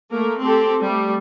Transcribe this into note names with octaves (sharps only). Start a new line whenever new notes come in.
A3 A#3 A#4
C4 G4 A4
G3 A3